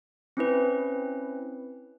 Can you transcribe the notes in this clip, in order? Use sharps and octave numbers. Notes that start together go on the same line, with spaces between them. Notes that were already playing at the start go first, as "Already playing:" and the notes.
C4 C#4 E4 B4